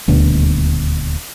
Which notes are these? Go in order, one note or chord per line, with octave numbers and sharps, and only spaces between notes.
D#1 D2 B2